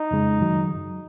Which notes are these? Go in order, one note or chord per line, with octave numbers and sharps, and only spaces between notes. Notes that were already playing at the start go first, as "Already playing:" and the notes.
Already playing: D#4
F2 C#3 G#3
F#2 D#3 F#3